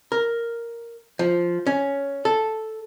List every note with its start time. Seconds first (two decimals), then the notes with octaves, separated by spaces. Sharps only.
0.12 A#4
1.19 F3
1.67 C#4
2.25 A4